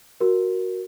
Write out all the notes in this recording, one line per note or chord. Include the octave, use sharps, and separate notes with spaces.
F#4 A#4